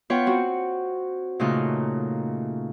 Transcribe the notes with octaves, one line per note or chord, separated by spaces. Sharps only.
B3 F4 B4 C#5 F#5 G5
C4 F#4
A#2 C#3 A3 D#4 F4 F#6